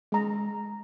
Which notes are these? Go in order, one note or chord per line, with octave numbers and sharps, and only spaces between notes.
G#3 A#5